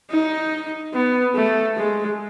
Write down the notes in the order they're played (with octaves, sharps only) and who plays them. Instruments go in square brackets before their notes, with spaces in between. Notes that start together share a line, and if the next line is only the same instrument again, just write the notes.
[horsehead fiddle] D#4
B3
A3
G#3